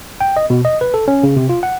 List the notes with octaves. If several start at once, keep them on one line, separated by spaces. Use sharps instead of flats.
G5
D#5
B2
D#5
B4
A4
C#4
C#3
C3
F4
F#5